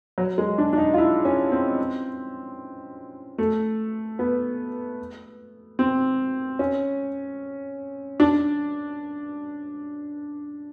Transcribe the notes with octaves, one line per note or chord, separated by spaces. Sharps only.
F#3
G#3
D4
D4
D#4
F4
E4
C#4
C4
A3
B3
C4
C#4
D4